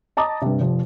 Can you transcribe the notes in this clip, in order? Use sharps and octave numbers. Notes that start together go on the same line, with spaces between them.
D#5 A5 A#5 D6 D#6
G2 C3
F1 F3